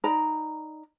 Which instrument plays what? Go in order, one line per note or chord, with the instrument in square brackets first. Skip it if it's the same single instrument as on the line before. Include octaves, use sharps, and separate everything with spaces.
[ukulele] D#4 D5 A#5 B5